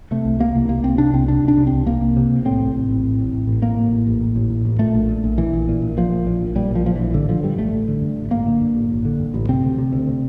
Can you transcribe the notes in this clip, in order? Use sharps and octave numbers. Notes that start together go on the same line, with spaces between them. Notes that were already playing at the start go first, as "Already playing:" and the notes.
C3 A3
C2
C3 A#3
C2
C3 A#3
C2 C4
C3 D4
C2 C4
C3 D4
C2
D4
C3
C2 C4
C3 A#3
C2
C3
C2
A2 C4
A1
A2
A1
A2
A1
A2
A1
A2 A#3
A1
A2
A1
A2
A1
A2
A1
A#2 A3
A#1
A#2
A#1
A#2 E3
A#1
A#2
A#1
A#2 F3
A#1
A#2
A#1
A#2 G3
A#1 F3
A#2 F3
A#1 E3
A1 D3
D3 F3
G2 G3
A1 A3
A1
D3
G2
A1
A1 A#3
D3
G2
A1
A1
D3
G2
A1
C3 C4
D2
C3
D2
C3